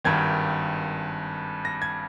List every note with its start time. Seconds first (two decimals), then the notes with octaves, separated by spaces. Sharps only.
0.04 G#1 G2 D#3 G#6
1.65 A#6
1.82 G#6